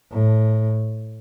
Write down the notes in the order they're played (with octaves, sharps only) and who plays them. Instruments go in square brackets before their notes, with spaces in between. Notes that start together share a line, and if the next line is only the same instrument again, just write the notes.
[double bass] A2